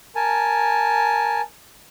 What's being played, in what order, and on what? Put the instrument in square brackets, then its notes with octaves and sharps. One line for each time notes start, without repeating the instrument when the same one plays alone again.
[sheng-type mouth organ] A#4 G#5 A5